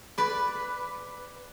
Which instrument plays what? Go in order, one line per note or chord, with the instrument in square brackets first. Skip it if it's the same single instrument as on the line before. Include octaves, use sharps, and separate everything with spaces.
[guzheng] B4 D5